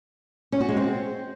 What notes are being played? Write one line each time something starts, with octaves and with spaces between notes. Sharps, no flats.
C#4
F#4
G#3
C4